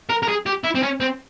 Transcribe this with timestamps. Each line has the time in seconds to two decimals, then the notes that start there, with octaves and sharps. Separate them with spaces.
0.10 A#4
0.23 A#4
0.29 G#4
0.46 G4
0.64 E4
0.75 C4
0.83 C#4
1.00 C4